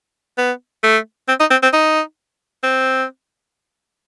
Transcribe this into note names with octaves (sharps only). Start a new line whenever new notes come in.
B3
A3
C4
D#4
C4
C4
D#4
C4